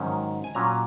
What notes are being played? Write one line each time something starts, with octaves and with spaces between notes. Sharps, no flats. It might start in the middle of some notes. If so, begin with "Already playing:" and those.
Already playing: G#2 D#3 F#3 C#4
G#5
A#2 F#3 C#4 A#5